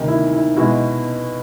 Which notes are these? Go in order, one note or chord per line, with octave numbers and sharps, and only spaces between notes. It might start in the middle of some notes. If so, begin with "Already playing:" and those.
Already playing: D2 C3 D#3 D#4
E4
E4
B2 G#3 E4 F#4